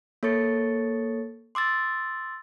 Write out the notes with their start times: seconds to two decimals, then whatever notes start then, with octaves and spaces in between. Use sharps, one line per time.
0.23 A#3 A4 C#5 C#6 A6 C#7
1.55 C6 D6 E6 A6